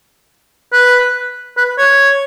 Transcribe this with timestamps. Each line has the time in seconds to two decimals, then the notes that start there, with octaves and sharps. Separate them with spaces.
0.73 B4
1.57 B4
1.78 C#5